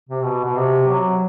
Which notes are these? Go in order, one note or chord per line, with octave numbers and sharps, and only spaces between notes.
C3
B2
B2
C3
F#3